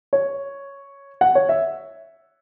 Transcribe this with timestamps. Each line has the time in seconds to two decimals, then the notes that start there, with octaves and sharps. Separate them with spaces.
0.13 C#5
1.21 F#5
1.35 C#5
1.49 E5